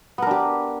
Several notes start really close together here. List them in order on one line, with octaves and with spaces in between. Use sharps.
B3 A#4 D4 G4